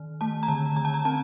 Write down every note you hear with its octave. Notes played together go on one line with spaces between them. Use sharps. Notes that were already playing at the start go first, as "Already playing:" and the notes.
Already playing: D#3
A3 A5
A#5
D3 A5
D3 A#5
A5
A#5
C4 A5